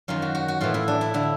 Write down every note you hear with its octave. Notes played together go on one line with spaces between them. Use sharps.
F#2 D#3 F4
F#4
F#4
F#4
A2 E3 F4
E4
D4
E4
D3 E4